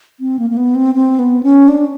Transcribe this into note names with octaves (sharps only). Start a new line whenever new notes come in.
C4
A#3
A#3
B3
C4
C4
B3
C#4
D4